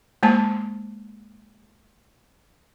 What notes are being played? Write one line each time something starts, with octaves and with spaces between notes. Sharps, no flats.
G#3 A#3 C5 A5